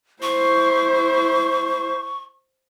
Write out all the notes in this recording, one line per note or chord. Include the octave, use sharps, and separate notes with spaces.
E4 C5 C#6